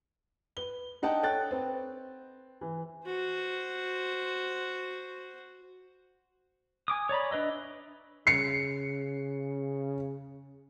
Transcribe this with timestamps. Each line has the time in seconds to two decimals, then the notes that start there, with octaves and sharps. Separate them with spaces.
0.57 B4 G7
1.02 D4 D#4 F#5 G5 A5
1.23 A4 C#5 G5 F#6 A6
1.51 C4 B4
2.61 E3
3.06 F#4 C5
6.88 G#5 D6 D#6
7.09 C#5 D5 A#5 B5
7.31 D4 B4 D#5 E5
8.27 C#3 C7 C#7